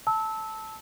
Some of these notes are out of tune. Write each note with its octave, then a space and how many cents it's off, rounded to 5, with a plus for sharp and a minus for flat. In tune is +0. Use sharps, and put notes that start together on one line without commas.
A5 +0 E6 -20